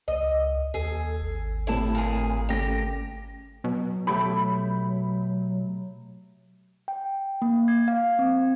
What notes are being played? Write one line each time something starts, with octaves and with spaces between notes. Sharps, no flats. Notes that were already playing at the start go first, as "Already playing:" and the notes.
C#2 D#5
D#2 G#4 A4
G#1
C2 A2 E4 A5
A#2 G#4
C#3 A3 G4 A#6
B2 F#3
A3 G4 C#5 B5
G5
A#3
G#6
F5
C4